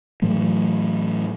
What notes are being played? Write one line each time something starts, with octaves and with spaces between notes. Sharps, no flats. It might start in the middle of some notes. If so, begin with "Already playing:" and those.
A2 E3 F#3 A3